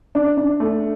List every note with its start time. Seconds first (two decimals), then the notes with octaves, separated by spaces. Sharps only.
0.15 D4
0.37 D4
0.60 A3